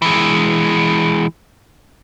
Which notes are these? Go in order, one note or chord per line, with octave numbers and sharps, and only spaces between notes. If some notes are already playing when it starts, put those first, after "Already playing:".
E3 G#3